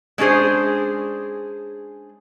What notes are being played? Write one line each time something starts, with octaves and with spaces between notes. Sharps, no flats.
G#3 C#4 D4 G#4 C5